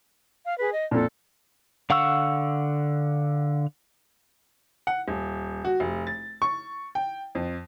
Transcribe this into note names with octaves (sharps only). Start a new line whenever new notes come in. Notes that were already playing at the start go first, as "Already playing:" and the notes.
F5
G#4 B4
D#5
F2 A#2 A4
D3 F5 F#5 C#6 E6
F#5
D#1
F#4
F1
A6
C#6
G5
F2